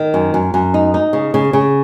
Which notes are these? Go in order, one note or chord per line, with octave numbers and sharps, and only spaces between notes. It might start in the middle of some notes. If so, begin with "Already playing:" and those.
Already playing: D#3
F#2
F#2
F#2
D#4
D#4
C#3
C#3
C#3